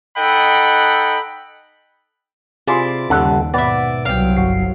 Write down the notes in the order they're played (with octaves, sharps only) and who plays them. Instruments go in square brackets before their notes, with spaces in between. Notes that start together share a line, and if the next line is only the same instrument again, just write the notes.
[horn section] D#4 A4 D#5 F#5 G5 B5
[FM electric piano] C3 F4 C6 [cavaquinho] E4 D5 [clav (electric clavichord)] G#4 C5
[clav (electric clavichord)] G1 A4 F#5 [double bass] D#2 [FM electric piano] C#3 G3
[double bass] G#2 [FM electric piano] B2 [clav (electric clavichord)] B3 [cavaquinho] D5 E5
[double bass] C2 F#3 [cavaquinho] F5 G5
[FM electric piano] G1 F#4 C7